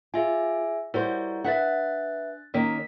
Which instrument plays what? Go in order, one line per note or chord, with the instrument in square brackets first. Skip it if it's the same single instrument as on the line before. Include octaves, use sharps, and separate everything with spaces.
[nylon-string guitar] F4 [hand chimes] G#4 E5 G#5
[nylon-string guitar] G3 F#4 C5 [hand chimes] E4 A#4 C#5
[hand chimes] D4 F#6 A6 [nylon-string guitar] B4 E5 F#5
[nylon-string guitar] D#3 A#3 C#4 [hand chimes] A#4 B6